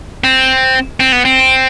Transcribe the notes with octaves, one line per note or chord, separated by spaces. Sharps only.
C4
C4
B3
C4